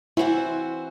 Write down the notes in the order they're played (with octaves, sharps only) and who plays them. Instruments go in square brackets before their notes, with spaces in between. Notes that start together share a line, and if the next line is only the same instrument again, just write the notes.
[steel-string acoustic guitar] E3 C4 F#4 C5 [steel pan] E4